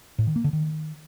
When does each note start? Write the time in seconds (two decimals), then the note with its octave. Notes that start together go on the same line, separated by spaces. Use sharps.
0.18 A2
0.27 D#3
0.36 A#3
0.44 D3
0.53 D#3